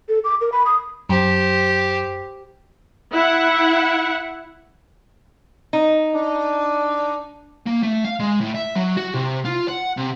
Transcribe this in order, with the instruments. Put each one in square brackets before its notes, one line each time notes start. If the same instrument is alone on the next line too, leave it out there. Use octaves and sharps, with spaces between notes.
[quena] A4
D6
A#4
B5
D#6
[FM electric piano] F#2 [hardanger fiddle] G4 C5
[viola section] E4 F#5
[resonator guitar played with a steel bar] D#4
[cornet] D4
[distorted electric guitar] A#3
A3
F5
G#3
A2
E5
F#3
F#4
C3
F4
F#5
C3